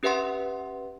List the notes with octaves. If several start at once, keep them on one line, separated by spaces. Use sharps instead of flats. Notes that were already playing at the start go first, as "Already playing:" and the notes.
C#4 G4 B4 E5 F#5 C6